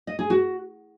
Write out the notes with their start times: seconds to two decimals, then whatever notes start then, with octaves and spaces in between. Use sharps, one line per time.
0.07 D#5
0.19 G#4
0.30 F#4